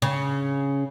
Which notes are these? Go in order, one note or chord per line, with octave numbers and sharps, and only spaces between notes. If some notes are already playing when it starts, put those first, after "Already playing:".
C#3